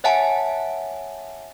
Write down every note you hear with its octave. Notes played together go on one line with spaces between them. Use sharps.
C#5 E5 F#5 G#5 A5